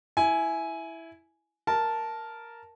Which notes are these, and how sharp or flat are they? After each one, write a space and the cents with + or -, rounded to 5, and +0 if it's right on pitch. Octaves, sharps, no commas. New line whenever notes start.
E4 +0 G#5 +15
A#4 +0 A5 +0